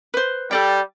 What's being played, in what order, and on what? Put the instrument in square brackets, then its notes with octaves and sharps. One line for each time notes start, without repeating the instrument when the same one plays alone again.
[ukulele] B4 C5
[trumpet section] G3 [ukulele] A4 D5 G5